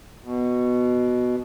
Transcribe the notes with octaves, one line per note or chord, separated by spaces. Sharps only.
B2